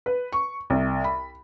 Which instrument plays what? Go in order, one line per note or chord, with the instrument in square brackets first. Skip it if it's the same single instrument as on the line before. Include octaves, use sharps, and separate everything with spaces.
[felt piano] B4
C#6
C2
B5